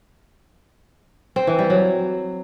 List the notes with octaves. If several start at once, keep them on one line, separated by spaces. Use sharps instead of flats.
C4
E3
G3
F#3